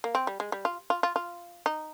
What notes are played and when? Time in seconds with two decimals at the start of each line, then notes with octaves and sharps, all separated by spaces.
0.04 A#3
0.15 C4
0.27 G3
0.40 G#3
0.52 G3
0.65 F4
0.90 F4
1.03 F4
1.16 F4
1.66 D#4